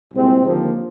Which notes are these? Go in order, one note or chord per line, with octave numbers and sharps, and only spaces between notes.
C2 A#2 G#3 C4
D#2 D3 F3 A#3